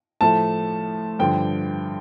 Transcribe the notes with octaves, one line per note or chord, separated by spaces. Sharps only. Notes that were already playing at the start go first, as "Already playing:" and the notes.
A2 F3 A3 A5
G2 D3 F3 G5